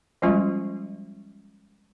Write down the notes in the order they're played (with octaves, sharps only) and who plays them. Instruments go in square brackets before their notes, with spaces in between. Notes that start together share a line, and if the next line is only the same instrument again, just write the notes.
[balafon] F3 G3 G#3 C#4 F4 F#4